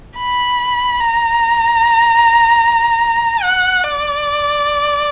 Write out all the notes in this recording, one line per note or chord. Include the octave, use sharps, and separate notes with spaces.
B5
A#5
F#5
D5